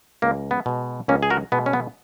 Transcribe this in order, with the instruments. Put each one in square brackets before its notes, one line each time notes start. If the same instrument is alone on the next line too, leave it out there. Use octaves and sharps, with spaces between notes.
[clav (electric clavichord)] C#2 A#3
B3
B2 G#3
C#2 A#3 C#4
G#4
F#4 A#4
B2 G#3 B3
C#4
B3